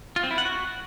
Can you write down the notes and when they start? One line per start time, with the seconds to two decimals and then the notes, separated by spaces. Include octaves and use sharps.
0.16 F4
0.23 C4
0.31 E4
0.38 F#5
0.45 F#4